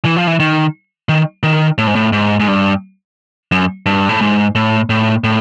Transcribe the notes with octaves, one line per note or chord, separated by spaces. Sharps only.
E3
F3
E3
D#3
D#3
D#3
A2
G#2
A2
G#2
G#2
G2
F#2
G2
A2
G#2
A2
A2
A2